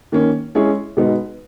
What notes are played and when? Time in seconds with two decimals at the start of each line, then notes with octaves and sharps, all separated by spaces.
0.12 D#3 A#3 C#4
0.55 G#3 C#4 E4 G#4 C#5
0.97 B2 G#3 B3 D#4